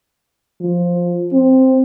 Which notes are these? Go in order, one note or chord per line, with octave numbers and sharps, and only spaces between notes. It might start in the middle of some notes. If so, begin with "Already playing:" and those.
F3
C4